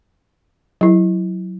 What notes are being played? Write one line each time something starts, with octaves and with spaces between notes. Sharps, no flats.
F#3 E4